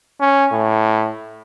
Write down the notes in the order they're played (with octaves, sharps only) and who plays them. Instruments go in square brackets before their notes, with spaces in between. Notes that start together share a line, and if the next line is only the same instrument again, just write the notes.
[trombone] C#4
A2